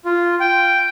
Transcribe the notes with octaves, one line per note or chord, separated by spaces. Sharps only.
F4
G5